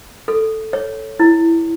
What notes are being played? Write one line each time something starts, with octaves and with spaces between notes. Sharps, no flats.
A4
C#5
E4